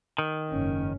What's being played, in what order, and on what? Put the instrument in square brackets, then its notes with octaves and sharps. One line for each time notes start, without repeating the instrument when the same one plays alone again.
[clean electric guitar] D#3
[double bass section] F#1 G#2 C#4